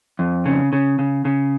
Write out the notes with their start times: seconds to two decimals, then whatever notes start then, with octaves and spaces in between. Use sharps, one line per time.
0.19 F2
0.46 C#3
0.73 C#3
0.99 C#3
1.25 C#3